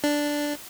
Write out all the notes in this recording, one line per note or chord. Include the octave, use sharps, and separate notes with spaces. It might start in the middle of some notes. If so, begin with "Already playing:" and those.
D4